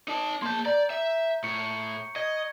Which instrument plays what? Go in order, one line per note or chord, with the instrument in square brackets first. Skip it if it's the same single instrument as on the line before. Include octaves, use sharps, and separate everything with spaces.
[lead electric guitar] D#4 A5
[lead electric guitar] A#3 A5 [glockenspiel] C6 G6
[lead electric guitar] D5 [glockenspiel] A#5 G6
[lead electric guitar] E5
[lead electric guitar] A2 [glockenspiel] C#6 C#7
[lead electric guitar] D#5 [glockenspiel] G#6